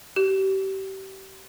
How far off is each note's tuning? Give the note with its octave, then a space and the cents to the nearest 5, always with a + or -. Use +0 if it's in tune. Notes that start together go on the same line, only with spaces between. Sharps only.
G4 -30